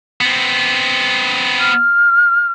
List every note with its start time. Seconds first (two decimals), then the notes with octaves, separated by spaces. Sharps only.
0.21 B3 C4
1.59 F6